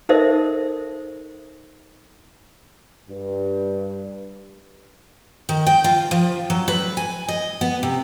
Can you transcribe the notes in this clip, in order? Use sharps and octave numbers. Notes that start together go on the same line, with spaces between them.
D#4 A4 A#4 C5 D#5 E5
G2
D#3
G5
F4
F3
F#3
B4
G#5
D#5
B3
C3